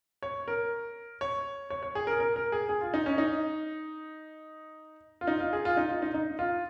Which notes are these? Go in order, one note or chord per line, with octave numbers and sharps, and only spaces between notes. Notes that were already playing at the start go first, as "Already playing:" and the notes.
C#5
A#4
C#5
C#5
C#5
G#4
A#4
A#4
A#4
G#4
G#4
F4
D#4
C#4
D#4
F4
D#4
F4
G#4
F4
D#4
F4
D#4
D#4
F4